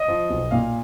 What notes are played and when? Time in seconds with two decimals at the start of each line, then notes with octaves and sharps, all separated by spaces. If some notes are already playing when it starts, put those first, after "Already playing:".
Already playing: D#5
0.08 F3
0.30 B1
0.51 A#2 F5